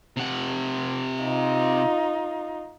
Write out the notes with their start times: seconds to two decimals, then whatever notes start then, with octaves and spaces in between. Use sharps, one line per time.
0.17 C3 F#5
1.24 D#4 F4